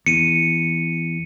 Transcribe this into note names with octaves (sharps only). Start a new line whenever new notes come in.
E2 C#7 D#7